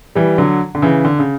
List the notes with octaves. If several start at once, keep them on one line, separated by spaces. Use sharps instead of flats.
E3 G3
D3 F#3
D3
C#3 E3
D3
C#3